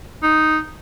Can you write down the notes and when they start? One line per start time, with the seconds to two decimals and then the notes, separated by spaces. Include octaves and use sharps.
0.23 D#4